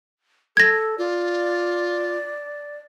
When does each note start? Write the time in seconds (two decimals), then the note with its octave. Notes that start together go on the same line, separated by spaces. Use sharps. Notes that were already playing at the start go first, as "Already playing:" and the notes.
0.57 A4 G#6 A#6
0.98 F4 D5